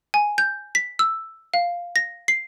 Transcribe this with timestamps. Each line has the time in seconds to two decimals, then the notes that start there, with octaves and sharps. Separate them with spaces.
0.14 G#5
0.38 G6
0.75 B6
0.99 E6
1.54 F5
1.96 A#6
2.28 C7